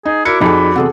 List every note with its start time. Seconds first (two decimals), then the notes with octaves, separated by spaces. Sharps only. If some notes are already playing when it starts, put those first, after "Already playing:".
0.05 D#4 G#4
0.25 E4 F#4 A#4 D5 D6 C#7
0.41 F2 D#4 G#4 A4 B5
0.76 E2 G2 C3 G#4 A4 F#5